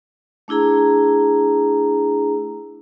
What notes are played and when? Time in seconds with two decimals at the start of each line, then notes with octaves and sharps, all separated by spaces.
0.48 A3 D4 E4 G#4 A#5